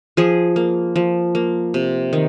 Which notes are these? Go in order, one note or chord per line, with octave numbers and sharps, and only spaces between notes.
F3 G#4
A#3
F3
A#3
C3
D#3